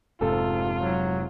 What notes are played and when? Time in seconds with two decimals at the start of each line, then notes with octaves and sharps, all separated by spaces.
0.21 F1 G#2 C3 F4 A4
0.79 F#3